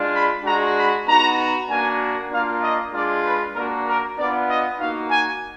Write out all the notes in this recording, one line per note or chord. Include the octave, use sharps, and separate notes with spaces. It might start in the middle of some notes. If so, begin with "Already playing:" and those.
Already playing: G#3 D4 F4
B5
G#3 D4 F#4 A#5
B5
B3 D#4 F#4 A#5
A#3 D4 F#4 G#5
A#3 D4 F4 F5
D#5
G#3 D4 F4 D5
B4
A#3 D4 F#4 A#4
A#4
B3 D4 F4 D5
D#5
A#3 D#4 F#4 F5
G#5